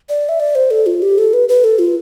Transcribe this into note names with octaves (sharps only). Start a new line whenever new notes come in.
D5
E5
D5
C5
A4
F4
G4
A4
B4
B4
A4
F4